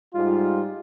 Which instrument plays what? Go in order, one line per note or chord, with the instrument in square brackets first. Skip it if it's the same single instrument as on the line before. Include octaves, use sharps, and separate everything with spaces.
[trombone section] G#2 G3 F4